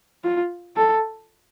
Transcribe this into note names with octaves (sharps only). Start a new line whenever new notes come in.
F4
A4